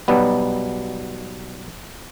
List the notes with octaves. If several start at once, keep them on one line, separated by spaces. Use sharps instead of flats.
B1 B2 F#3 G3 B3